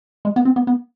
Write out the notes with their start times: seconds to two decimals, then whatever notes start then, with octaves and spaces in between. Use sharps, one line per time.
0.25 G#3
0.36 B3
0.45 C4
0.56 B3
0.67 B3